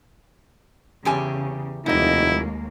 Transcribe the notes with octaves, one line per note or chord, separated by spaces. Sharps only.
E2 C#3 G4 G#5
F1 D#2 G#3 A#3 D#4 E4 D#5